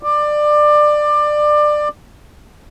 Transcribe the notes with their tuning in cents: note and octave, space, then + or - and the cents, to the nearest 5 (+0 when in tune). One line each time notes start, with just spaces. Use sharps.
D5 +20